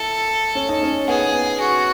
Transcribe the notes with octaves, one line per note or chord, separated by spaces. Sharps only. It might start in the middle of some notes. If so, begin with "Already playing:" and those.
Already playing: E4 A4
C#4
D#4
C#4
B3 G#4
B3
F#4